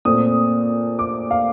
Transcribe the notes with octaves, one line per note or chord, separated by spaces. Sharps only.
A#2 A3 C4 D#6
D6
F5